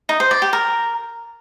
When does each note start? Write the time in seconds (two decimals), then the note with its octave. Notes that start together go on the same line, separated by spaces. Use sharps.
0.09 D#4
0.20 C5
0.31 D5
0.42 G4
0.53 A#4